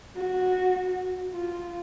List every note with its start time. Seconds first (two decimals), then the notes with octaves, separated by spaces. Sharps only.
0.17 F#4
1.32 F4